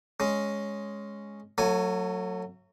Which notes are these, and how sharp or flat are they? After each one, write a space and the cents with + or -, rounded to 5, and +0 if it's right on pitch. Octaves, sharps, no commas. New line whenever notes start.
G#3 +0 C#4 +0
F#3 -15 A3 +30 G#5 +0